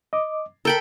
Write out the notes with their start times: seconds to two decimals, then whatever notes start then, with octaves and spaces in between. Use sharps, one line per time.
0.13 D#5 D6
0.65 A4 A#4 G5 B5